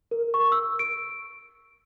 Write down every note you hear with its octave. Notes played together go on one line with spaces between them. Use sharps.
A#4
C#6
E6
D7